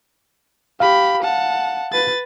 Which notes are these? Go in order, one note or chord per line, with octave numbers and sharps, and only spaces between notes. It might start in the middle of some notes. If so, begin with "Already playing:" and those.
G4 F5 B5
F#5 A5
B4 A6